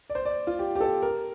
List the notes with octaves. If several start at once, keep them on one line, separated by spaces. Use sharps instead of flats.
D5
C5
D5
F4
G4
G4
A4
A#4